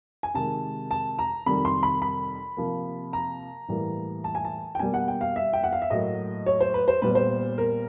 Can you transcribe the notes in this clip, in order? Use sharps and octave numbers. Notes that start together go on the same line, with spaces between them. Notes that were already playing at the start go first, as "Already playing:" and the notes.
G#5
C3 D#3 G#3 A5
A5
A#5
F2 C3 D#3 G3 B5
C6
B5
B5
C3 F3 A#3
A#5
A2 E3 G3 A#3
A5
G#5
A5
G5
B2 G3 A#3 G#5
F#5
G5
F5
E5
G5
F#5
F5
E5
A2 F#3 A#3 D#5
C#5
C5
B4
C5
A#2 G3 B3 B4
C5
A#4